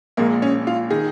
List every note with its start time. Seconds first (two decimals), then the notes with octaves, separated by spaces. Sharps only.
0.17 A#1 A#2 G#3 A#3
0.42 C#4
0.67 F4
0.90 D#3 G#4